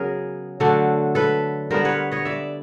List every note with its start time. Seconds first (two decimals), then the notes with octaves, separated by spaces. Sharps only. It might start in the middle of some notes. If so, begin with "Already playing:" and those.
Already playing: C#3 F#3 B3 G#4 A#4
0.60 D3 F#3 A3 D4
1.15 A4 B4
1.70 D3 G3 B3 A#4 C5
1.85 B4 C#5
2.12 C#5 D#5
2.25 D5 E5